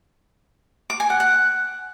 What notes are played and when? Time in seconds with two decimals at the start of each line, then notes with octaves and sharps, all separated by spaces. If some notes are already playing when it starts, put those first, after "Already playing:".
0.90 D6
1.00 G#5
1.10 F#5
1.20 F#5